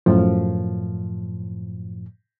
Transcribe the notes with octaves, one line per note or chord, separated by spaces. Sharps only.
F#2 A2 F3